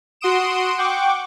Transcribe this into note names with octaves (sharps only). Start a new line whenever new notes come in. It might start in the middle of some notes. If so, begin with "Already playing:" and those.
F#4 F#5 C6 D#6 D7 E7
F#5 G5 C#6 D6